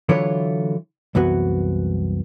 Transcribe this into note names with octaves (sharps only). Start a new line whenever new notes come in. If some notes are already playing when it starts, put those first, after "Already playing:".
D3 E3 F#3 E4 F4 C#5
C2 F#2 E3 B3 F#4